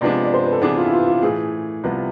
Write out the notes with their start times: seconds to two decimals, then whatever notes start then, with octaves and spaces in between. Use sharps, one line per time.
0.01 C3 F3 G#3 B3 D4 D5
0.25 D5
0.34 C5
0.44 B4
0.52 A4
0.62 C3 E3 B3 D4 G#4
0.77 F4
0.87 E4
0.93 F4
1.07 F4
1.22 A2 E3 A3 G#4
1.83 C2 C3 F3 B3 E4